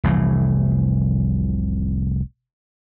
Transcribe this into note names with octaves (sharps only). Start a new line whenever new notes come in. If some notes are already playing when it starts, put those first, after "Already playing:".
F1 C2 A2 E3